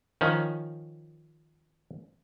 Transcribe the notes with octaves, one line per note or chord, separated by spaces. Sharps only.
D#3 F3 C#4